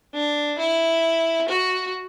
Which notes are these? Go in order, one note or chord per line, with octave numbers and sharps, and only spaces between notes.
D4
E4
F#4